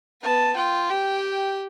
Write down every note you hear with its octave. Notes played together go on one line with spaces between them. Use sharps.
B3 A5
F4 G5
G4 G5